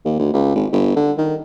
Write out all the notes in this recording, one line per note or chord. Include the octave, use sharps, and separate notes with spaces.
D#2
D2
C#2
G#1
G1
D3
D#3